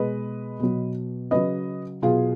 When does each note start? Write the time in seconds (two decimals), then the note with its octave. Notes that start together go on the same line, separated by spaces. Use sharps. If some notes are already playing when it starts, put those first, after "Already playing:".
Already playing: B2 G#3 B4 D#5
0.59 B2 F#3
1.31 C#3 F#3 B4 D#5
2.02 B2 F#3 F4 G#4